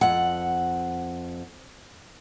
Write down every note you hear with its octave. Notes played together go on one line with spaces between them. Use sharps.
F2 F#5